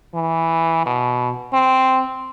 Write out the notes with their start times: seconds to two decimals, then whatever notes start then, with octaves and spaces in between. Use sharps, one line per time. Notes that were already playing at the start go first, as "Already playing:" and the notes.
0.15 E3
0.86 B2
1.53 C4